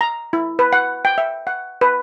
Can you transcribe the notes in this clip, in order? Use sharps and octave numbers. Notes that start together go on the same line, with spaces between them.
A#5
E4
B4
F#5
G5
E5
F#5
B4